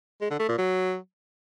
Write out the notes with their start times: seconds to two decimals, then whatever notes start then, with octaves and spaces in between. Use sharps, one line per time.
0.21 G#3
0.31 D3
0.40 A3
0.49 A#2
0.58 F#3